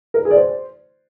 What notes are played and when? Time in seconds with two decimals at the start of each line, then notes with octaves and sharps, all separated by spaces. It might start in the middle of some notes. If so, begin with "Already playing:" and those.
0.14 A#4
0.20 B4
0.25 G#4
0.31 D5
0.36 C5